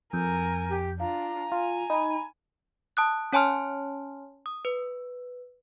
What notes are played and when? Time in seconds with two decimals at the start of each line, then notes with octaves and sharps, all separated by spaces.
0.13 F2 A#4 G#5 G6
0.69 G4
1.00 D4 F4 F5 A#5
1.52 F4 G#5
1.90 D#4 B5
2.97 A5 D#6 F#6
3.33 C#4 C#5 G#5 A5 C6 F6
4.46 D#6
4.65 B4